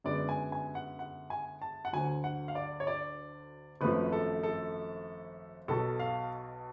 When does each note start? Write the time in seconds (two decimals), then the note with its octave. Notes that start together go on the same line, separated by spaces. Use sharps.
0.04 F#2 D3 G#3 B3 D5
0.29 G#5
0.52 G#5
0.75 F#5
0.99 F#5
1.30 G#5
1.62 A5
1.85 F#5
1.93 D2 D3 F#3 G#5
2.24 F#5
2.48 F5
2.55 D5
2.80 C#5
2.87 D5
3.81 G#1 F#2 F3 A3 B4
4.12 A4
4.43 A4
5.68 B1 B2 F#3 A4
5.99 F5